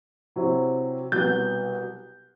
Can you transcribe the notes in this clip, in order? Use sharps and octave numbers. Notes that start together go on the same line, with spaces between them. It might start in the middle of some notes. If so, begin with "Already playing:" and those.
C3 F#3 C4 E4
C2 B2 F#3 B3 G6